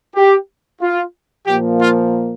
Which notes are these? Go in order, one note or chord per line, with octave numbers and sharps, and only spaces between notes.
G4
F4
A#2 F3 A#3 G4
F4